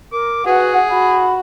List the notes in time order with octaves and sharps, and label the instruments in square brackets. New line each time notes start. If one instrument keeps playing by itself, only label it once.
[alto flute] A#4 [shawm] D6
[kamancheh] F#4 F#5 [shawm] G#4 [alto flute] B4
[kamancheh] F#4 [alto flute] B5